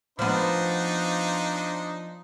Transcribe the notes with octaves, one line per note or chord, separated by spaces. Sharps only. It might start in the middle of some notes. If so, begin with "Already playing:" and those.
F3 B3 D4 D#4 C5